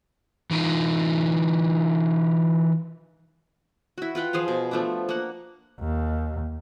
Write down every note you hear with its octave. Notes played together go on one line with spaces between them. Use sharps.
E3 D#4 F4
E4 F#4
F4 B4 F#5 G5
F3 G#4 C5 F5
B2
F3 A3 B3 D4
A#3 F#5
D#2